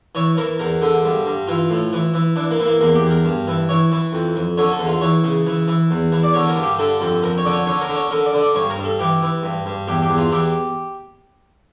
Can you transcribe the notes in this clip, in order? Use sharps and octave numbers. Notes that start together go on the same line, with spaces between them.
E3 C#5
E3 A#4
E2 A#4
D3
G2
G2
E3 F4
A2
E3
E3
E3 D4
A#3
E3
A#3
E2 A#3
G4
E2
A#4
G2
E3
E3 C#5
E3
F2
F2
D3 C#5
A4
E2
F4
E3 C#5
C#3
E3
E3
E2
E3
D5
D3 C#5
A#4
G2
G4
D3 A4
F2 A4
F2 A#4
C#5
D3 D5
C#5
D3 C#5
A#4
D3
C#5
D3 A#4
D5
D3
D5
G2 C#5
A#4
G2
A4
E3 G4
E3
G2
G2
E2 G4
G4
E2
F4
E3 G4